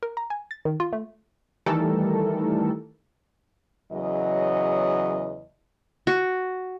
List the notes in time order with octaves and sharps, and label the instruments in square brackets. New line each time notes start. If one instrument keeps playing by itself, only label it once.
[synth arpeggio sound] A#4
A#5
G#5
A6
D#3
F4
A3
D#3 E3 G3 A3 A4 A#4
[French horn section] E2 C#3 F#3 D#5
[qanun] F#4